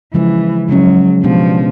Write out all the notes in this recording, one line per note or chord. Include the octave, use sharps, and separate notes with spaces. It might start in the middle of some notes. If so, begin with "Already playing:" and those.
C#3 E3 F3 G#3 C#4
C#3 F3 F#3 G#3 C#4
B2 F3 G#3 B3 D4 G4